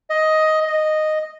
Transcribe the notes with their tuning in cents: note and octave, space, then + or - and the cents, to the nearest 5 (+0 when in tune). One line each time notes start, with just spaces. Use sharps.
D#5 +10
D#5 -5